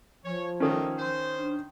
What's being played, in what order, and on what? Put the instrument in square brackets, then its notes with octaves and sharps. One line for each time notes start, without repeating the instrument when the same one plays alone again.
[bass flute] F3 [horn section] C#5
[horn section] B2 A3 A#3 [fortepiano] D#3 C#4
[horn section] C5
[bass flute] D4